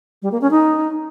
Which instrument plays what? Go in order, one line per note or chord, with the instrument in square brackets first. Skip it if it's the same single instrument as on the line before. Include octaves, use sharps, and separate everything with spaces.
[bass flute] G3
A#3
C#4
D#4